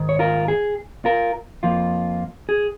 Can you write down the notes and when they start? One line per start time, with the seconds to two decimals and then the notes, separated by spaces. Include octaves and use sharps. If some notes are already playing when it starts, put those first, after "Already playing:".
Already playing: G#2 D#3 G#3
0.09 C#5
0.19 F4 A#4
0.48 G#4
1.05 F4 A#4
1.63 F2 F3 A#3 F4
2.49 G#4